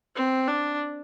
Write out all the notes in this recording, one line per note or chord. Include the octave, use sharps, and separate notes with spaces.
C4
D4